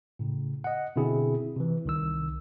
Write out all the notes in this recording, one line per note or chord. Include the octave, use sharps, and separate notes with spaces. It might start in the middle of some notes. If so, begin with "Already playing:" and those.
A2 C#3
D#5 F#5
B2 D3 C4 E4 G#4
C3 E3
C2 D#3 E6